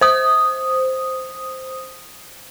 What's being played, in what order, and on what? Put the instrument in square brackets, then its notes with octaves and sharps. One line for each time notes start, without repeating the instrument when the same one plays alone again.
[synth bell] C5 D#6